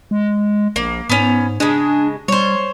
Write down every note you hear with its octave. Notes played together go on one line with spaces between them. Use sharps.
G#3
A#1 A#3
G#2 B3 C#4
C#3 G#3 D4
G3 C5 C#5